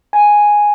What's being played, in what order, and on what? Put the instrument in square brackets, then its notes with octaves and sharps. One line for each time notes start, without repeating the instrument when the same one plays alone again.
[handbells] G#5